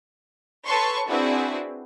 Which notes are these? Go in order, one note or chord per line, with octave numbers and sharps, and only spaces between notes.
A4 B4 C#5 A5 C6 C#6
C4 D4 E4 F#4 G#4 B4